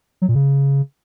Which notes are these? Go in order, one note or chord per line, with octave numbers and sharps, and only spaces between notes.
F#3
A#2
C#3